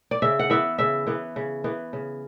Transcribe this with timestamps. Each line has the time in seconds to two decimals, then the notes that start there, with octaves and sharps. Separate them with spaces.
0.11 D5
0.22 C#3 E5
0.39 F#5
0.50 E3 B3 E5
0.78 C#3 E5
1.07 E3 B3
1.36 C#3
1.64 E3 B3
1.93 C#3